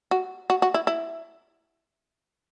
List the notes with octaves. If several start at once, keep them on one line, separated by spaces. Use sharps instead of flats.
F#4
F#4
F#4
E4
E4